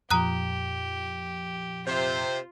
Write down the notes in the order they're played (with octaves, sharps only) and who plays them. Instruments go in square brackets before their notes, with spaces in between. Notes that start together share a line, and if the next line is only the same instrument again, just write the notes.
[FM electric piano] F2 A#2 F3 [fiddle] G4 [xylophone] A#5 D#6 F#6
[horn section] C3 C5 [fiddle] F4